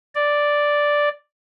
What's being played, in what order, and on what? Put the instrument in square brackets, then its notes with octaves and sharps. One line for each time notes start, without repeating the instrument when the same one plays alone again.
[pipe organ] D5